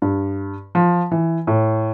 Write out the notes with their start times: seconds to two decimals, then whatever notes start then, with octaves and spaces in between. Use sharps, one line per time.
0.02 G2
0.75 F3
1.11 E3
1.47 A2